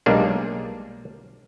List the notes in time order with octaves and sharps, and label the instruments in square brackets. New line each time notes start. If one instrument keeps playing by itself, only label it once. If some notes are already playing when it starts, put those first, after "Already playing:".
[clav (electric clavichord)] B1 G3 G#3 A#3 D4